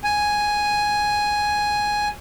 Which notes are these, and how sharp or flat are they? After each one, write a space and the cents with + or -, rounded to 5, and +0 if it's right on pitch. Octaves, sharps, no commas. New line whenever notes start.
G#5 +0